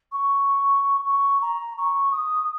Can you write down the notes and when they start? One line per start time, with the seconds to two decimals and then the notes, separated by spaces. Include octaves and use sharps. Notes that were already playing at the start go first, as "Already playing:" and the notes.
0.12 C#6
1.07 C#6
1.42 A#5
1.78 C#6
2.12 D#6